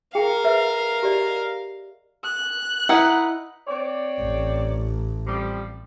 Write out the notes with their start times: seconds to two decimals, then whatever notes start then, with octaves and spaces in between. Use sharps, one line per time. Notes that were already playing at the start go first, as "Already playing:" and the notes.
0.15 G#4 A#4 F5 G5
0.44 B4 E5
1.03 G4 D5 D#5
2.24 F#6
2.89 D#4 E4 B4 F#5
3.67 C4 C#5 D5
4.21 A1
5.27 C3 F3 G3